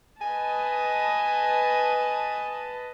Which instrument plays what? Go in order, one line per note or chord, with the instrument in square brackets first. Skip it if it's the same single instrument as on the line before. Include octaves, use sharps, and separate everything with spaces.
[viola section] B4 D#5 A5 [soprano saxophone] G#5